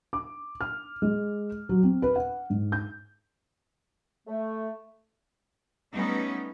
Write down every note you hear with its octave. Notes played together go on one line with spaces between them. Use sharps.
D6
F6
G#3
F#3
C4
B4
F#5
G#2
G6
A3
G3 A3 B3 C#4 D#4